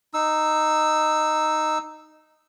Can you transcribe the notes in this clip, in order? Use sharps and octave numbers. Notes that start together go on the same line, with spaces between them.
D#4 E6